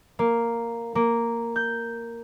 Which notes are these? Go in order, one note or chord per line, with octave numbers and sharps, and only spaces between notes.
A#3
A#3
G6